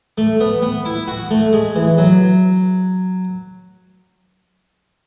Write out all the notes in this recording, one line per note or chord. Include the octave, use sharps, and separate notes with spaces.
A3
B3
B3
E4
F#4
A3
G#3
E3
F#3